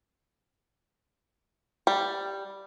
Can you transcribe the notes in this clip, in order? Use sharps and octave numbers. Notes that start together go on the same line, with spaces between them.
G3